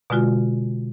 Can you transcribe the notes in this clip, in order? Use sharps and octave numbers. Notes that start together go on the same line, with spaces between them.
B2 D3 G#3 F4 F#4